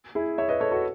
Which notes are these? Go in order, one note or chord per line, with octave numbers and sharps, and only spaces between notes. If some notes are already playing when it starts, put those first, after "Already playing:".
E4 G#4
C#5 E5
B4 D#5
A4 C#5
F#4 A4